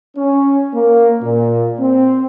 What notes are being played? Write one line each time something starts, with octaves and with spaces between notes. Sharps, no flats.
C#4
A#3
A#2
C4